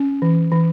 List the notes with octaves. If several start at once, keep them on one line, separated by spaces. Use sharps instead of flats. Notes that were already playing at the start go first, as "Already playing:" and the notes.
Already playing: C#4
E3
E3